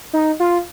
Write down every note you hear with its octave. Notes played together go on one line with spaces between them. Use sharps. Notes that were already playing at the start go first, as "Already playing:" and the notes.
D#4
F4